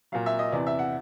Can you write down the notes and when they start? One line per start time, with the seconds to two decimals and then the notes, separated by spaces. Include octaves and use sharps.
0.12 A#2 F#3 F5
0.26 E5
0.39 D#5
0.52 E2 C3 E3 D5
0.67 E5
0.79 F#5